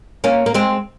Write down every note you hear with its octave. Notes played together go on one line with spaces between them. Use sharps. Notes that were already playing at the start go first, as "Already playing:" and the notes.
A#3 C#4
A#3
G#3 C4